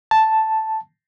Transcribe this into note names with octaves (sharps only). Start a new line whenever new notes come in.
A5